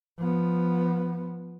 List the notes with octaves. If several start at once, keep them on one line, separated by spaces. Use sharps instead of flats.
F3 B3